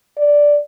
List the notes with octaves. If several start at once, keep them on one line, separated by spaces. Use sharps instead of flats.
D5